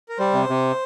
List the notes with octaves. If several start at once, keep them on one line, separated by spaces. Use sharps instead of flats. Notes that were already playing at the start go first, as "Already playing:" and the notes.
A#4
G3 C5
C3
C3